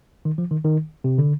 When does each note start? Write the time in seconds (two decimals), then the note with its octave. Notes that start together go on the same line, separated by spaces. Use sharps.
0.25 D#3
0.38 F3
0.51 D#3
0.64 D#3
1.04 C3
1.18 D3